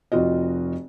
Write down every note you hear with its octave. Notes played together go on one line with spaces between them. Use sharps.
F1 C4 F4 F#4 D#5